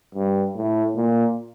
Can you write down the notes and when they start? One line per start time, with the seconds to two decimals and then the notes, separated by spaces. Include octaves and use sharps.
0.15 G2
0.56 A2
0.96 A#2